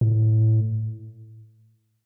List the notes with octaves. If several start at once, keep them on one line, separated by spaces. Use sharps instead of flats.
A2